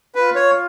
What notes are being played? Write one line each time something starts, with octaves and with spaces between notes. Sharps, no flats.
F4 B4
C#5